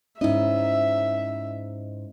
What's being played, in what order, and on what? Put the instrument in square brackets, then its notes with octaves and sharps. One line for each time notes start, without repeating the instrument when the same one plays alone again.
[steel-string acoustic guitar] G#2 D#5 [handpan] C#4 D#4 E4 [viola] E5